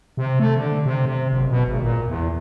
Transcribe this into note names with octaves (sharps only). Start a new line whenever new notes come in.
C3
A3
D3
C3
C3
F#1
B2
G#1
A#2
E2